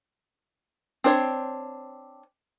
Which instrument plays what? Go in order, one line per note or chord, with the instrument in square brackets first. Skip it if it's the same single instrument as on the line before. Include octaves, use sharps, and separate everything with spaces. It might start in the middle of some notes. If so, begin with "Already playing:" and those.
[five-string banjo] C4 D4 C5 C#5